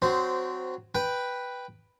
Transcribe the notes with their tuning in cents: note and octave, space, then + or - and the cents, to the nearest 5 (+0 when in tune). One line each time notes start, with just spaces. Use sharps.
F#3 +0 C4 -20 C5 -10
B4 +0 G5 +0